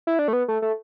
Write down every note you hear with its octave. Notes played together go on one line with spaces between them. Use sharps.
E4
D4
A3
B3
A3
A3